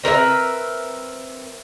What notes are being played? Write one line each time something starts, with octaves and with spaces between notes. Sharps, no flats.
C4 A#4 B4 E5